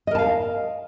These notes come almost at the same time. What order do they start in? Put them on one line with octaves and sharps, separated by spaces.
D#5 A#4 A5 F5